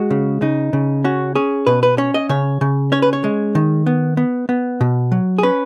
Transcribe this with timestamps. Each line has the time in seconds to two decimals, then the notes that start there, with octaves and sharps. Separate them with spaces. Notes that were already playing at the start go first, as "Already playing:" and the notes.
Already playing: G#3 F#4
0.10 C#3
0.42 C#3 D#4
0.73 C#3
1.04 C#4 F#4
1.35 C#4 G#4
1.67 B2 B4
1.83 B4
1.98 C#4 C#5
2.14 D#5
2.29 C#3 C#5
2.61 C#3
2.92 C#4 C#5
3.02 B4
3.13 C#5
3.24 G#3
3.55 D#3
3.86 B3
4.17 B3
4.49 B3
4.81 B2
5.12 F#3
5.38 G#4
5.43 C#4 B4